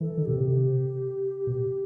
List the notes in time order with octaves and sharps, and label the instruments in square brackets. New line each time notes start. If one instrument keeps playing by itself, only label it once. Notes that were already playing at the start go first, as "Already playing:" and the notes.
[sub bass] E3 [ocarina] A4
[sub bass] D#3
[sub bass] B2 [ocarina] G4
[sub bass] C3
[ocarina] G4
[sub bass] B2